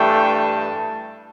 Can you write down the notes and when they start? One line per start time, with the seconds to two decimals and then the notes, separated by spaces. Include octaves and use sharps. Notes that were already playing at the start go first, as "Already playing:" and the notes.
Already playing: G2 E3 A3 D4 G5
0.34 A5